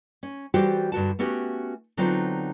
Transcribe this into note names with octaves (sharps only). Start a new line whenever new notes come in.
C#4
E3 G3 F#4 G4 A4 C5
G2 D3 F#4 A5
A3 B3 C#4 F#4 G4
D3 F#3 B3 C4 D#4 F4